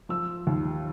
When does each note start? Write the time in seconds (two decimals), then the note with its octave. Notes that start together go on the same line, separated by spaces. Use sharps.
0.09 F3 E6
0.47 D#2